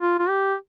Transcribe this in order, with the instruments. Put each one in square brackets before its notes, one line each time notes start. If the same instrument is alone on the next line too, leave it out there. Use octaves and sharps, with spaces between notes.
[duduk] F4
F4
G4